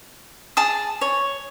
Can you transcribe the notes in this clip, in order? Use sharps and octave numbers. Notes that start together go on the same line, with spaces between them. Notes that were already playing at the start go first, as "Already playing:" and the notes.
G#4 A5 D#6
C#5